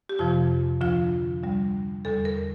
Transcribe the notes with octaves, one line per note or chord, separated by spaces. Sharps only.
G4
F2 C3 F3 F4
D2 D3 F3 F4
D2 D3 G3
E2 D3 G3 A4
A#4